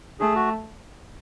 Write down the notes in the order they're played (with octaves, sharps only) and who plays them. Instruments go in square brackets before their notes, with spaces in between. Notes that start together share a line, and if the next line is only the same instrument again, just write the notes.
[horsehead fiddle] A3 [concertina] G#4
[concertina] F#4